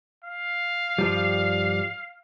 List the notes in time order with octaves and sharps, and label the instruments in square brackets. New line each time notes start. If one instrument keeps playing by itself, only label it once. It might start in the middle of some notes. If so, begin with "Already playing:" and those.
[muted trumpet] F5
[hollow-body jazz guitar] G2 F3 G3